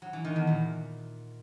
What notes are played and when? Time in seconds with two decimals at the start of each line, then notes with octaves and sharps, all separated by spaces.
0.02 F#3
0.13 E3
0.25 D#3
0.36 E2
0.47 A#2